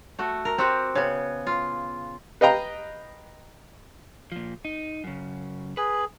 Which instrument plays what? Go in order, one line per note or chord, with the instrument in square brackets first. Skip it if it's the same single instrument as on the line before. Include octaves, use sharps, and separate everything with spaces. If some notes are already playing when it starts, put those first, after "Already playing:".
[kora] A3 F#4
A#4
C4 F#4 G4 F#5
C#3 B3
F4
[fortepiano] B4 D#5 F5 G5 A#5
[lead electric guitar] A#2 F3
D#4
F#2 C#3
[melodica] G#4 [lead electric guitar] B4